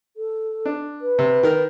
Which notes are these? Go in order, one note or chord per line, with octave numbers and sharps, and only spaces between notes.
A4
D4
B4
C3
D#3 A#4